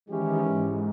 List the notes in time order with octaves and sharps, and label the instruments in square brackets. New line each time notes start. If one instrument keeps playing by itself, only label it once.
[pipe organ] D#3 [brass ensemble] E3 G#3 C#4 E4 G4
[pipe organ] G#2